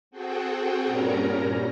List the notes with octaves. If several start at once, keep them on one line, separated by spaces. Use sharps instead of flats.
C4 F#4 G#4 A4 F#5 G5
G2 A#2 G3 C#4 A#4 A#5